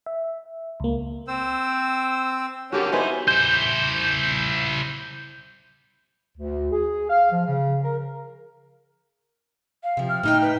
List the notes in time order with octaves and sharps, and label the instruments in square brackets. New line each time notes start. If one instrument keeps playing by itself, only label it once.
[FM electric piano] E5
C#2 A#3
[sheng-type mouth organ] C4 C5 E6
[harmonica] D3 A#3 C#4 [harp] F#4 G4 A4
[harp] B3 B4 G#5 [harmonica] D#4 E4 C5
[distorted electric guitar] E4 C5 [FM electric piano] G6
[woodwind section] D2
G#4
F5
F3
C#3
A#4
[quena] F5
[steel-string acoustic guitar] C3 F3
[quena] F6
[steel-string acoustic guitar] A2 D#4 G5 [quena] F6
[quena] B4